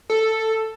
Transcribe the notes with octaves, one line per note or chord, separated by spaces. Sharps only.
A4